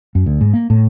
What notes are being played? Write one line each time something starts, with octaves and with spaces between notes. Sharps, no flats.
F#2
D2
G#2
A#3
A2